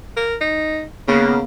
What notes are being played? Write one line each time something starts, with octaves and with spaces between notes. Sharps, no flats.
A#4
D#4
C#3 A#3 B3